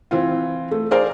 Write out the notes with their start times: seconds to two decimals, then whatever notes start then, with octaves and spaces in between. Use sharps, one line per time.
0.11 E3 C4 F4
0.71 A3
0.91 G#4 A#4 C5 D5 F5